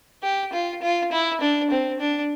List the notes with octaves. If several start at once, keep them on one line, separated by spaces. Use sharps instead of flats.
G4
F4
F4
E4
D4
C4
D4